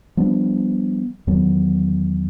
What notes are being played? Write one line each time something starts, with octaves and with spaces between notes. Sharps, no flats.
F3 G3 B3 D4
E2 D#3 F#3 B3